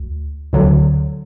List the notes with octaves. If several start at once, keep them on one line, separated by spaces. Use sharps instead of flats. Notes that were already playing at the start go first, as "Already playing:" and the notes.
Already playing: D2
D2 D3 F#3